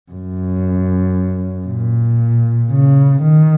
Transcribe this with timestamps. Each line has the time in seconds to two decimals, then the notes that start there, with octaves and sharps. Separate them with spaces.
0.11 F#2
1.67 A#2
2.71 C#3
3.22 D#3